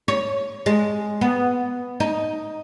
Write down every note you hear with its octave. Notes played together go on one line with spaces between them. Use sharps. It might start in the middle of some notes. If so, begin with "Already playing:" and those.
C#5
G#3
B3
D#4